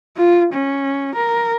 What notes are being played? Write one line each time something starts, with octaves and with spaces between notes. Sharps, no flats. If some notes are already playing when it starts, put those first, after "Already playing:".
F4
C#4
A#4